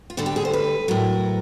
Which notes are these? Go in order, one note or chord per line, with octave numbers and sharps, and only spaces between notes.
F4
D2 D3 G3 F#4
G4
G#4
C5
B4
A2 F#3 A#4